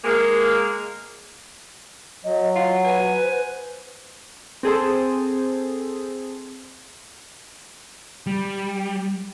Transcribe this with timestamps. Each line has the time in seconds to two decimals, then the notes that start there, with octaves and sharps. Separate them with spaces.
0.04 G#3 A#3
2.24 F#3 D#5
2.56 F4 F#5
2.84 B4 G#5
3.22 C5
4.63 C4 G#4 A4 C5
8.27 G3